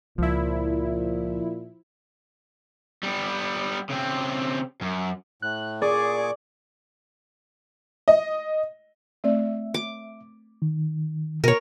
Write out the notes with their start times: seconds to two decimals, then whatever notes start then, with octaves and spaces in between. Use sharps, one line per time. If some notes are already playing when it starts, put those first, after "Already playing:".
0.18 C#2 A#2 F3 E4
3.03 G3 B3
3.90 C#3 C4
4.81 F#2
5.42 A2 F#6
5.82 A#2 G#4 D5 C#6 D6
8.08 D#5
9.24 A3 C4 D5 E5
9.74 D6
10.62 D#3
11.44 B2 A#4 C#5